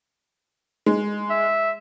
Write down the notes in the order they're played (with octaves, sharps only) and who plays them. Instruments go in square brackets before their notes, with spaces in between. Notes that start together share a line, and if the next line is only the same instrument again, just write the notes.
[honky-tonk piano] G#3
[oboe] E5